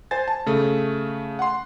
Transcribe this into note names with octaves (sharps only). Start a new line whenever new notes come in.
C5 G#5 A6
A5
C#3 A3
F#5 C6